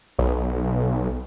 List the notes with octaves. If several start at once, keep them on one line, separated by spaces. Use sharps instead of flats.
B1